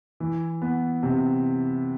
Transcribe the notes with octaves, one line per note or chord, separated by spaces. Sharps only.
E3
B3
C3